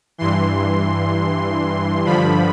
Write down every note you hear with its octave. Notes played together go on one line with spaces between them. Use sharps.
G2 E3 C6
G2 D3 F3 B5